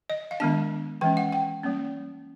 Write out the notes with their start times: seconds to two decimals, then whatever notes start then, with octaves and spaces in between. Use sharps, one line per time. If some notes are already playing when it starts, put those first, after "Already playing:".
0.10 D#5
0.31 F5
0.40 D#3 G#3 B3 D4 A5
1.01 E3 G#3 C#4 G5
1.17 F#5
1.32 G5
1.63 G3 A#3 C#4